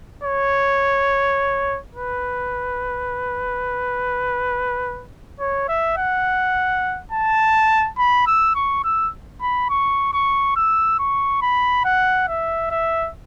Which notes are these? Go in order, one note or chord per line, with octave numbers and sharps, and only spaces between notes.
C#5
B4
C#5
E5
F#5
A5
B5
E6
C#6
E6
B5
C#6
C#6
E6
C#6
B5
F#5
E5
E5